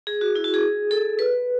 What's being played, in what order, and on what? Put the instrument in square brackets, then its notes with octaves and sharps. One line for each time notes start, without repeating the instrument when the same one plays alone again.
[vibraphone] G#4
F#4
E4
F#4
G#4
A4
B4